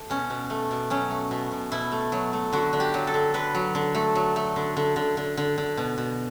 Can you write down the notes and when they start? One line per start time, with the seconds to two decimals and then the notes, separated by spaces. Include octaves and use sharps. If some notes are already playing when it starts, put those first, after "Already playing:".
Already playing: A3
0.10 B2 C#4
0.30 B2
0.50 A3
0.71 B2
0.90 F#3 C#4
1.10 A3
1.31 B2
1.52 B2
1.72 B2 E4
1.92 A3
2.12 F#3
2.33 A3
2.53 D3 F#4
2.73 D3
2.80 G4
2.94 F#3
3.07 A4
3.14 D3
3.34 D3 B4
3.55 F#3
3.75 D3
3.95 A3
4.15 F#3
4.36 A3
4.56 D3
4.77 D3
4.96 D3
5.17 D3
5.37 D3
5.58 D3
5.77 B2
5.98 B2